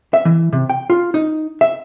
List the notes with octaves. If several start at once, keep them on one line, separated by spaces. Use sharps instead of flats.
E5
E3
C3
G5
F4
D#4
E5